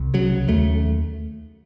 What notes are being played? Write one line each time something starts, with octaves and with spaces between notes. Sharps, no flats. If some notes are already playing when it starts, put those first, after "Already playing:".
Already playing: C2
C#3 F#3
D#2 A3